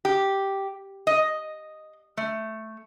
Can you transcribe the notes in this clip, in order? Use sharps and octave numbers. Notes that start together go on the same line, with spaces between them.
G4
D#5
A3